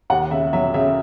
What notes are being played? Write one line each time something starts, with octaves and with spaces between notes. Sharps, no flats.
D#2 F#5
C#3 E5
F#3 E5
C#3 E5